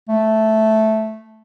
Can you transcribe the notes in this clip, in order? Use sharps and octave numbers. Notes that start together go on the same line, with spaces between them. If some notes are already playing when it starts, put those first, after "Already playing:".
A3